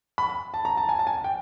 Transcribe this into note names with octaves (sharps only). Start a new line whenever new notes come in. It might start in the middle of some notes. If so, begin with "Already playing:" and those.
B5
A5
A#5
A5
G#5
A5
G#5
G5